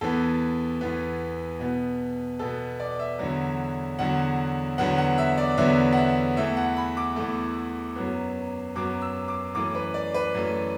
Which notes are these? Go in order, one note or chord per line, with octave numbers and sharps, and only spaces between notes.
E2 E3 B3 A4
E2 E3 B3
B2 B3
B2 B3 A4
D5
E5
E2 D3 F#3
E2 D3 F#3 F#5
E2 D3 F#3 B3 F#5
F#5
E5
D5
E2 D3 F#3 B3 E5
F#5
E5
E2 E3 A3 E5
F#5
B5
D6
E2 E3 A3
F#2 F#3 B3
F#2 F#3 B3 D6
E6
D6
F#2 E3 A3 D6
B4
D5
B4
F#2 E3 A3